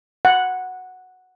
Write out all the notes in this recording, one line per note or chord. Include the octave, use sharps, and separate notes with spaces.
F#5